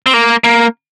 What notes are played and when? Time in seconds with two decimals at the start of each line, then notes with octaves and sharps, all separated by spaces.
0.06 C4
0.14 A#3
0.44 A#3